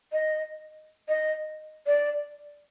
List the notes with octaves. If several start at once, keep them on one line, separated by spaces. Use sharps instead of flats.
D#5
D#5
D5